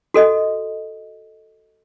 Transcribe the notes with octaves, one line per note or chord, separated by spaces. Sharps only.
F#4 A4 D#5